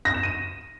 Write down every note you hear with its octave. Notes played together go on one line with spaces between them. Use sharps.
A#6
E7
D#7